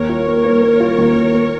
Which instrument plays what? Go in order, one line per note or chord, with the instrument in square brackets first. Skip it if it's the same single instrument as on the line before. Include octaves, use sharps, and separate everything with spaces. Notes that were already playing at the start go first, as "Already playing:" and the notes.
Already playing: [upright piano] D#2 [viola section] A#4 C#5
[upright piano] F4
A#3
A#3
A#3
F4
D#2
D#2
A#3